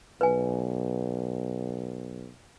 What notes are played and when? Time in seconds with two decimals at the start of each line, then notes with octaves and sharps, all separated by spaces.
0.21 B1 B4 G#5